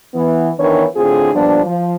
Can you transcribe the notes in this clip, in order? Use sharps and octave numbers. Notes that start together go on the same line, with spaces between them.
E3 B3
D#3 E3 B3 D4 A#4 C#5
A2 D3 C4 F4 G#4
A#2 F3 G3 B3 D4
F3